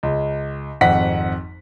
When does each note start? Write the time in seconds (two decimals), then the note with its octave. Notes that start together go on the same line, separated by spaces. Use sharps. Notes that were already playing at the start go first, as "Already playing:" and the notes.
0.03 C#2
0.81 G#1 F2 F#5 B6